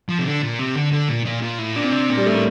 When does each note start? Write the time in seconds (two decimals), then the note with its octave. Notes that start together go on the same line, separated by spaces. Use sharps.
0.09 F3
0.19 C3
0.25 D3
0.43 A#2
0.59 C3
0.76 D3
0.92 D3
1.09 A#2
1.26 A#2
1.42 A#2
1.59 A2
1.76 A#2 D4
1.84 C4
1.92 C3 D4
2.09 A#2 C4
2.17 G3
2.26 A2 A3
2.34 A#3